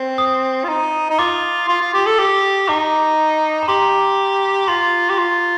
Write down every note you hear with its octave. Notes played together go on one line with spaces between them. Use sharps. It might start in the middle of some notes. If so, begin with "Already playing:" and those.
Already playing: C4
D#6
F4
D#4
D#4
F4 D6
F4
F4
G4
A4
G4
D#4 D6
A#5
G4 C6
F4 C6
G4
F4